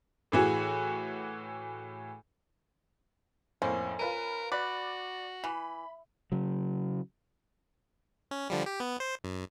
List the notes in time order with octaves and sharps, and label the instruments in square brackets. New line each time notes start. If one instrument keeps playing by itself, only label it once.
[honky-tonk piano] A2 E3 F#4 G#4
[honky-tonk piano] F2 A2 A#3 [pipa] C#4 [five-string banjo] C5
[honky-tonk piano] F4 B4 D#7 [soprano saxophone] A#4
[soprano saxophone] F#4 [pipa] B4 [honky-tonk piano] D5
[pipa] E3 [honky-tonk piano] B5
[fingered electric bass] C#3 F#3
[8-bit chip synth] C#4
D3 F3 G3
G4
B3
C5
F#2